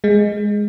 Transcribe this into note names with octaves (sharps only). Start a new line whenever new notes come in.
G#3